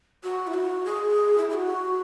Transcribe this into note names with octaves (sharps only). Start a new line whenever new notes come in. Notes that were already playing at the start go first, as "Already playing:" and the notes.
F#4
E4
F#4
G#4
E4
G#4
F#4